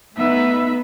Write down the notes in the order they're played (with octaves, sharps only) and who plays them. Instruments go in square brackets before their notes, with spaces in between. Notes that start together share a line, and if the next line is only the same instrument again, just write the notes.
[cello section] A3 B3 D#4 [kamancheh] B4 E5